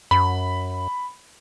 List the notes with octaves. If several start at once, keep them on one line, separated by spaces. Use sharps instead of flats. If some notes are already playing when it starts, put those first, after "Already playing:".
F#2 B5